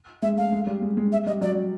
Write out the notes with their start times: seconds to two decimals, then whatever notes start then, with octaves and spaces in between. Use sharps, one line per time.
0.22 G#3 E5
0.37 A3 F5
0.52 G#3
0.67 G3
0.82 G#3
0.97 G#3
1.12 E5
1.26 G3 D#5
1.41 F#3 D5